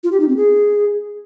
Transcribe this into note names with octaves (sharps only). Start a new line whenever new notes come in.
F4
G4
D#4
C4
G#4